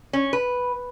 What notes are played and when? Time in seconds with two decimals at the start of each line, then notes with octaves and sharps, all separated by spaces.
0.13 C#4
0.33 B4